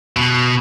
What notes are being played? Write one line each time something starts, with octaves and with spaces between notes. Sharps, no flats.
B2